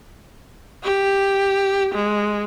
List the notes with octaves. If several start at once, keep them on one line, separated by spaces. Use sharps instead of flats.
G4
G#3